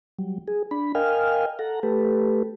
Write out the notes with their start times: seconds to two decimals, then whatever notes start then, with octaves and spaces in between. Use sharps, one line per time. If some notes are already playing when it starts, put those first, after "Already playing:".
0.19 F#3 G3
0.48 G#4
0.71 D4 B5
0.95 A#4 D#5 F5 G5 G#5 F6
1.59 A4 F#5 A#5
1.83 A3 G4 A4 B4